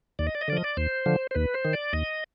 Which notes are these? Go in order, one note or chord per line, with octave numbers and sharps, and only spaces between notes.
D#2 D5
D#5
D5
D#5
D3 F3 D5 D#5
D5
D#2 C5
D3 F3
C5
D#2 B4
C5
D#3
D5
D#2 D#5